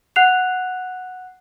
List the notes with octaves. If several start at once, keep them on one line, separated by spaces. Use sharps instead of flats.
F#5 F#6 C7 F7